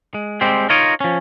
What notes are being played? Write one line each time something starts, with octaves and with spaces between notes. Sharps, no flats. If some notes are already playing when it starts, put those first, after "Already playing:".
G#3
G3 G#3 C4 G4
D#4 F4 A#4 C#5 D#5
F3 C#4